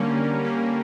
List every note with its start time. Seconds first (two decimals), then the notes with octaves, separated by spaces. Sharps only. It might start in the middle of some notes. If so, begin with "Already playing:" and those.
Already playing: D3 G3 A#3 C#4
0.16 D3
0.44 G3 A#3 C#4